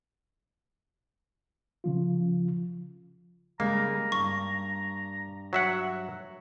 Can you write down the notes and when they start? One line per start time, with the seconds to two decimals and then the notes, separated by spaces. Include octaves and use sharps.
1.84 C#3 F3 F4
3.60 C#3 G3 G#3 A#3 A#5
4.12 G2 C#6
5.53 F#3 E5 F#5